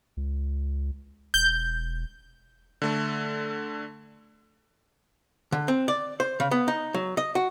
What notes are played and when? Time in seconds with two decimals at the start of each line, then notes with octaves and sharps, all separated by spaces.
0.17 C#2
1.34 E1 G6
2.82 D3 A3 A4
5.52 D3
5.68 C4
5.88 D5
6.20 C5
6.40 C#3
6.51 B3
6.68 D#4
6.94 F#3
7.17 D#5
7.35 F#4